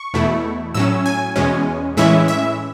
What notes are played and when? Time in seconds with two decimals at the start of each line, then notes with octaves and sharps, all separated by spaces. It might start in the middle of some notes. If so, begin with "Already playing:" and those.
Already playing: C#6
0.14 E2 B2 A3 E4
0.74 A2 F#3 C#4 E6
1.06 G#5
1.36 E2 B2 G#3 C#4
1.97 A2 E3 G#3 C#4 E4 E5
2.28 E5